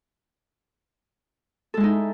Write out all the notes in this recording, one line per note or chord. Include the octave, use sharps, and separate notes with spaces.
G#3 D#4 E4 A4